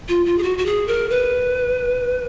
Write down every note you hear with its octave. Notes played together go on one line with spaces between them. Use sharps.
F4
F4
G#4
F#4
F#4
G#4
A#4
B4